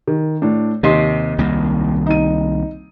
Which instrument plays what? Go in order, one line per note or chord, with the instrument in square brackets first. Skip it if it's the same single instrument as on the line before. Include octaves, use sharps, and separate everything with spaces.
[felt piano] D#3
A2 D4
[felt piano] D#2 D#5 C6 [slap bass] C3
[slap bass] C2 D#3 A#3
[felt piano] D#4 D#7